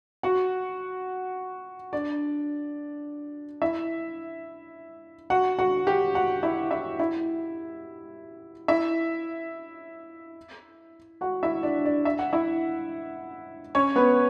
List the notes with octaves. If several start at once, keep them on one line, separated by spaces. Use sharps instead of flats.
F#4 F#5
D4 D5
E4 E5
F#4 F#5
F#4 F#5
G4 G5
F#4 F#5
E4 E5
E4 E5
E4 E5
E4 E5
F#4 F#5
E4 E5
D4 D5
D4 D5
E5
F#5
E4 E5
C#4 C#5
B3 B4